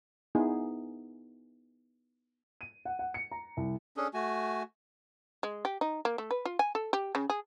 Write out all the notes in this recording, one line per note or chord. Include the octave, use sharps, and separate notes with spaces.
B3 D#4 E4 G#4
D#7
F#5
F#5
C#7
A#5
C2
C#4 D4 G#4 A4
A3 F#4 G#5
G#3
G4
D#4
A#3
A3
B4
F4
G#5
A4
G4
C#3
G#4